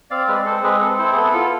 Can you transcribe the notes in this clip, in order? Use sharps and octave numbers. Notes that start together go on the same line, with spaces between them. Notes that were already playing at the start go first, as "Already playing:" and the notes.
C4 D5 F5
G#3 B4 D5
C4 A4 C5
G#3 G#4 B4
C4 A4
E4 A4 C5
G#4
B3 A4
F4 A4